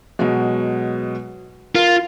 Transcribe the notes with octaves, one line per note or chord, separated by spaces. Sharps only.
B2 F#3 G#3
F4 A#4